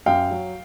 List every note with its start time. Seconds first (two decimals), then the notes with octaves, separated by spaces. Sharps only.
0.06 F#2 F5 G5
0.31 F#3